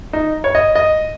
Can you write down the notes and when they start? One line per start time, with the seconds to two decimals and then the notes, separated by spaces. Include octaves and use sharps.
0.13 D#4
0.44 C#5
0.55 D#5
0.75 D#5